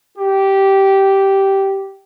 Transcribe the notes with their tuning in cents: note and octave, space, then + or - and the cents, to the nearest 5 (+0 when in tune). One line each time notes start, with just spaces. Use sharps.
G4 -10